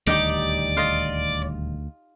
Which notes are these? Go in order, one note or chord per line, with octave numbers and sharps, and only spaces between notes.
D#1 D2 D#3 G3 D#4 G4 D5
F4 D#5